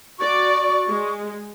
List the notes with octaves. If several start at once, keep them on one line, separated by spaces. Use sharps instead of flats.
F#4 D5 C#6
G#3